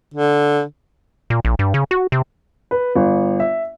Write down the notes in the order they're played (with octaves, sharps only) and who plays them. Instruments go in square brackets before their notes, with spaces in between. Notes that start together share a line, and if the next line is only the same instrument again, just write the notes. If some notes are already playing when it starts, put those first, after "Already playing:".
[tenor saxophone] D3
[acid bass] A#2
A#1
G2
C#3
F#4
C3
[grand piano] B4
G1
E5